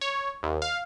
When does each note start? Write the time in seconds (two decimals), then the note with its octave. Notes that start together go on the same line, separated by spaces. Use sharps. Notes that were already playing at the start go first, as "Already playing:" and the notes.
0.01 C#5
0.43 D#2
0.62 F5